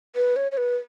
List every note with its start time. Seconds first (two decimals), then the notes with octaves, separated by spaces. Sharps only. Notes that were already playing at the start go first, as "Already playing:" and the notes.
0.16 B4
0.36 C#5
0.52 C#5
0.57 B4